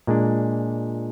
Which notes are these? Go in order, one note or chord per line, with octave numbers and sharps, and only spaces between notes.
A#2 G#3 D4